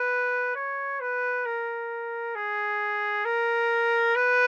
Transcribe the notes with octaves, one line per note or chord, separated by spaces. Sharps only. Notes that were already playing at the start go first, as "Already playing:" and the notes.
Already playing: B4
C#5
B4
A#4
G#4
A#4
B4